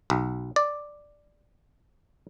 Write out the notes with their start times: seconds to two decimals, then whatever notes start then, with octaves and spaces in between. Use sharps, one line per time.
0.10 B1
0.56 D5